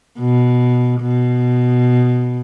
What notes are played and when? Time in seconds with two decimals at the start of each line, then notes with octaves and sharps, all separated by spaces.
0.19 B2
1.02 B2